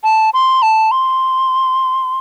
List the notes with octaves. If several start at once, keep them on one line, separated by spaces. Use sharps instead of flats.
A5
C6
A5
C6